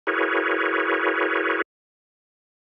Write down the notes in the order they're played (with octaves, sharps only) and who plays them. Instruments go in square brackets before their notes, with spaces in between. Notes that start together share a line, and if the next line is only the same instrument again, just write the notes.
[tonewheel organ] E4 F#4 G#4 A#4 B4 C#5